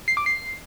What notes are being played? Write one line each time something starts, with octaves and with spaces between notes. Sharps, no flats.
C7
D6
C7